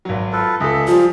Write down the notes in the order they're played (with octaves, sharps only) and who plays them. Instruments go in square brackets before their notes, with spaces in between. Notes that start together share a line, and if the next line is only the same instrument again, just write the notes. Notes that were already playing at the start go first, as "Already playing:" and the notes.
[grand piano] G#1 F#3
[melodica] F4 A4 B4
[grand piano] C#2 A4 [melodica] G#4 E5
[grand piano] F3 G3 [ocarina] F4 [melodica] G#4